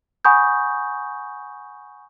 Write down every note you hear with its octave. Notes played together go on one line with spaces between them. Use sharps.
F#5 G#5 B5 C#6 D#6 G6